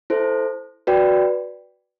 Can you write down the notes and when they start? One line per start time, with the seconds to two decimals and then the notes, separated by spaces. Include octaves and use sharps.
0.10 E4 A4 C5
0.87 F#4 B4 D5 G5